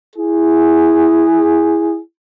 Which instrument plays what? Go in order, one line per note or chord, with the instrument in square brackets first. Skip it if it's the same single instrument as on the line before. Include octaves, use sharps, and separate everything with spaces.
[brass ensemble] E4 G#4